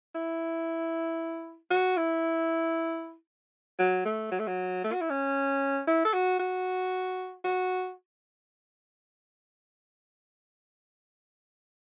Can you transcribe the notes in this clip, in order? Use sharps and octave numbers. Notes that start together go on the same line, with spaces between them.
E4
F#4
E4
F#3
A3
F#3
A3
F#3
A3
F#4
E4
C#4
E4
A4
F#4
F#4
F#4